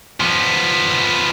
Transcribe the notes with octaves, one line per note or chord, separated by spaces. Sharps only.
F3 B3